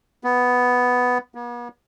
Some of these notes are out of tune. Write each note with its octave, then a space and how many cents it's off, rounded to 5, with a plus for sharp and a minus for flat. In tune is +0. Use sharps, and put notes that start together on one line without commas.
B3 +5
B3 -45